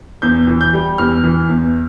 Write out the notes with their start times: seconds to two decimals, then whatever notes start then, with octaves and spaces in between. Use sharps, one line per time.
0.22 E2 G6
0.47 E3
0.61 G6
0.73 G3
0.98 E2 F6
1.24 E3
1.49 E2